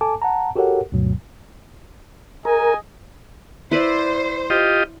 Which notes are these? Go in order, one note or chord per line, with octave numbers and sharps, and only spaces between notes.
A4 G#5 A5 D6
F#5 A5 A#5
F#4 G4 A4 A#4 C#5 F#5
D2 G2 B2 F#3
G#4 A#4 D#5 G#5
E4 B4 C5 D5
F4 G4 D#5